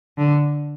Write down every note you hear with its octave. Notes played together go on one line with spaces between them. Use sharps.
D3